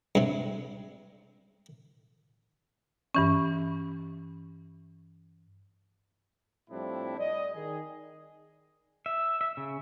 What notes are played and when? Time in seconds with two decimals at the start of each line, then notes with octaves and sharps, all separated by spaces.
0.15 G2 C3
3.15 G2 E3 C#4
6.70 A2 F3 G3 C4 D4 E4
7.18 D5 D#5
7.54 D#3 G#4
9.06 E5
9.41 E5
9.57 C#3